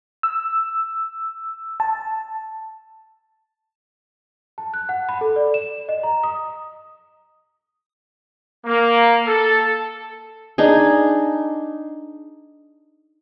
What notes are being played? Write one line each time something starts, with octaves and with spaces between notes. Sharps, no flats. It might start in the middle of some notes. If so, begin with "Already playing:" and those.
E6
A5
A5
F#6
F#5
B5
A4
D5
E7
D#5
A#5
D#6
A#3
A4
D4 D#4 G#4